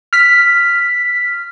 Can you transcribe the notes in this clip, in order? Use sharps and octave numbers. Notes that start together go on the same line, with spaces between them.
F6 B6